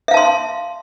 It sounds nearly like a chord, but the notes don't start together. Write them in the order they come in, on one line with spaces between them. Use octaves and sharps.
E5 F5 A5 C6